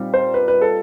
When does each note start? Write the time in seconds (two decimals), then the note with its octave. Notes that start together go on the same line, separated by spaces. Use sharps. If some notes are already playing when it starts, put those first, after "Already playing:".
Already playing: A#2 G3 C4 D#4
0.14 C5
0.34 B4
0.48 B4
0.61 A4